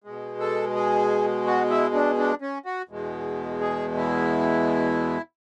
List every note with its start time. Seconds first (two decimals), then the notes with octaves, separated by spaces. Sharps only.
0.04 B2 G#3
0.40 A4
0.76 G#4
1.46 F#4
1.70 E4
1.95 D4
2.18 D4
2.42 C#4
2.66 F#4
2.89 E2 B2 G#3
3.61 G#4
3.97 E4